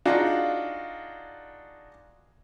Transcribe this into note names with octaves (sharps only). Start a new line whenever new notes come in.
D4 D#4 F4 F#4 G#4